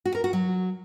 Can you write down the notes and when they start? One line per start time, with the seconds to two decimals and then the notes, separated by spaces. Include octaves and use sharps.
0.05 F#4
0.15 A#4
0.24 F#4
0.33 F#3